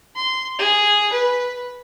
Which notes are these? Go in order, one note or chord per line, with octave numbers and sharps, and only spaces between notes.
C6
G#4
B4